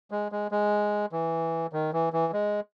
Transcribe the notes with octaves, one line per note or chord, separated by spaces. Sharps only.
G#3
G#3
G#3
E3
D#3
E3
E3
G#3